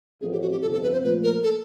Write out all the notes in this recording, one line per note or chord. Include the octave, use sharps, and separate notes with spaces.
A1 A2 F3 A3 C4 G#4
G4
F#4
G4
G1 F2 C3 F3 A4
A4
B4
C5
A#2 F3 A3 B4
A#4
A4